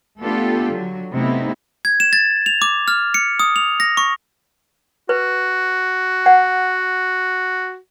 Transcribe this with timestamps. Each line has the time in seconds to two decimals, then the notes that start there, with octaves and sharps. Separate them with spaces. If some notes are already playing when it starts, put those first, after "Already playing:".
0.20 A3 B3 D4 F4 G4 A4
0.71 D3 F#3
1.13 C3 A3 B3 D#4 E4
1.85 G#6
2.00 E7
2.13 A6
2.46 F7
2.62 D6
2.88 F6
3.14 C#7
3.40 D#6
3.56 F7
3.80 A#6
3.97 C#6
5.09 F#4 B4
6.26 F#5